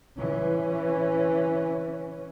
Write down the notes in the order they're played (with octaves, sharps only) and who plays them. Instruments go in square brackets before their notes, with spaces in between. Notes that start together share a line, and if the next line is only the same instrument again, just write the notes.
[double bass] E3 C#4